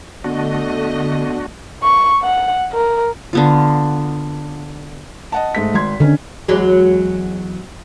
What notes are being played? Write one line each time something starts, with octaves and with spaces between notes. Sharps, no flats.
D3 A3 B3 D4 F#4 D#5
C#6
F#5
A#4
D3 B3 F4
D#5 F#5 A5
G#2 A3 B6
G#1 C6 G#6
D3 D#3 C#4
E2 F#3 G#3